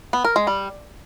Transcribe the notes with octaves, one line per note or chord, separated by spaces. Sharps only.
B3
A#4
G#3
G3